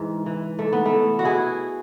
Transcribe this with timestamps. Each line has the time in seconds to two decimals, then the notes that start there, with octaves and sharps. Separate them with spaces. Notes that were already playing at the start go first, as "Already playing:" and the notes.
Already playing: G#2 E3
0.26 E3
0.59 G#2 A3
0.73 B3
0.85 A3
0.92 E3
1.19 F#4
1.25 E4 G#4